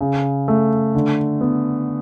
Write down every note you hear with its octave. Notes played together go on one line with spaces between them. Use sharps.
C#3
A3
D3
B3